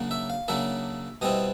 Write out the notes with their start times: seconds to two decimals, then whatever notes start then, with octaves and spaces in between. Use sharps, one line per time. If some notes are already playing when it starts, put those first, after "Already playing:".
Already playing: C#3 F#3 A#3 D4
0.11 E5
0.30 F5
0.48 C#3 F#3 A#3 D4 E5
1.21 B2 G3 C4 E4 D#5